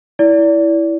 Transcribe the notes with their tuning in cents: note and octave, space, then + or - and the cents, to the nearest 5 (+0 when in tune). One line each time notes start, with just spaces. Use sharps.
E4 +0 D5 -30